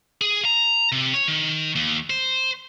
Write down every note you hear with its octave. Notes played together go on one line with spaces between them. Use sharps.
G#4
A#5
C3
C#5
D#3
D#2
C5